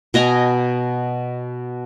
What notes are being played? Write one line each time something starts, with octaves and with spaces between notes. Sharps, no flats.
B2 D#5 G#5 A#5